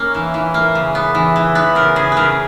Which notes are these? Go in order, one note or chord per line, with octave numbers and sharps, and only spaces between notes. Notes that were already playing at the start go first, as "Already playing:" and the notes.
Already playing: A#3 C#4
E3
E3
A#3
C#3
B3
E3
E3
B3 B4
C#3 A#4
C#3 G#4
C#3 A#4 B4